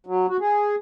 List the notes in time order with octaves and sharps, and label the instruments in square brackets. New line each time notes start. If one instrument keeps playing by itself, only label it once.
[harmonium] F#3
F#4
G#4